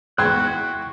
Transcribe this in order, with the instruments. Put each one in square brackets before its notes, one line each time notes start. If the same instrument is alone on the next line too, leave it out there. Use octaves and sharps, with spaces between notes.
[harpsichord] E2 G#2 [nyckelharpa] E4 F#4 [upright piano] G5 C6 G#6 [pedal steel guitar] F#6